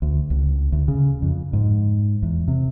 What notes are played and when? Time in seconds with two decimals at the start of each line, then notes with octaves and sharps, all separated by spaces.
0.02 D2
0.30 C#2
0.72 D2
0.88 C#3
1.22 F2
1.53 G#2
2.22 E2
2.48 C3